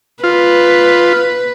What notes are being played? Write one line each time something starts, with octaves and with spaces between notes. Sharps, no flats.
F4 B4